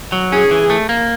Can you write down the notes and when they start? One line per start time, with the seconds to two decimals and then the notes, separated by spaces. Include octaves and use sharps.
0.12 F#3
0.32 C#4 G#4
0.51 E3
0.70 A3
0.89 A#3